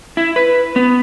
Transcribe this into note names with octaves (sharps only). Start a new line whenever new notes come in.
E4
B4
B3